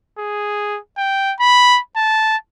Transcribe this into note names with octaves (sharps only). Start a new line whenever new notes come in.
G#4
G5
B5
A5